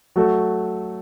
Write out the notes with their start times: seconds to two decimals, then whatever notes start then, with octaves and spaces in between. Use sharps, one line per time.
0.16 F#3 A3 F#4 A4